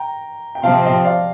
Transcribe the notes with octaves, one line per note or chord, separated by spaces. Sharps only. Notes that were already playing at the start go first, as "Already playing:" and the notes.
Already playing: G5 A#5
G5
C3 F3 C4 F5 A5
D#5 G5
D5 F5